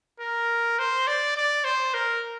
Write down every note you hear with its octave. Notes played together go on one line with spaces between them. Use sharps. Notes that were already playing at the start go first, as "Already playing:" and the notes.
A#4
C5
D5
D5
C5
A#4